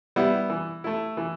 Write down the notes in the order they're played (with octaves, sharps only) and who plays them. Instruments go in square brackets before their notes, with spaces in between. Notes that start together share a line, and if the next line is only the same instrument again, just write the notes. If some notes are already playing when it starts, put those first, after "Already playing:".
[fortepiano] G3 B3 E4
E3
A3 E4
E3